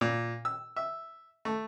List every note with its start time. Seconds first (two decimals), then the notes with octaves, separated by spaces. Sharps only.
0.01 A#2
0.45 E6
0.76 E5
1.45 A3